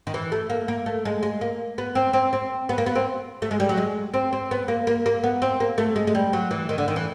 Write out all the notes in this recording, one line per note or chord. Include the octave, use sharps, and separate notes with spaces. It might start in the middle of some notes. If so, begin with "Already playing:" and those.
D#3
E3
A3
A#3
A#3
A3
G#3
G#3
A#3
B3
C4
C4
C4
B3
A#3
B3
C4
A3
G#3
G3
F#3
G#3
C4
C4
B3
A#3
A#3
A#3
B3
C4
A#3
A3
G#3
G#3
G3
F#3
E3
D#3
D3
D#3
E3